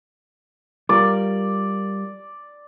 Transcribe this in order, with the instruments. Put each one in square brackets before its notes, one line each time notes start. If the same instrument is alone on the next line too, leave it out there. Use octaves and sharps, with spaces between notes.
[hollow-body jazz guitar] G3 F4 A#4 [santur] D5